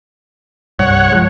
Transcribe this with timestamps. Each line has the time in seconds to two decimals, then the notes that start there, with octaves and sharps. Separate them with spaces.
0.79 C2 G2 C#5 F#5
1.12 F3 G#3